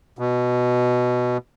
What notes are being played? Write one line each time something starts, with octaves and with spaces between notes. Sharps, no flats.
B2